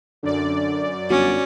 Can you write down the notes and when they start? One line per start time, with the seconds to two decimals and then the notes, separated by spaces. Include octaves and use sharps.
0.23 F#2 D3 D5
1.10 G1 C#4 F#4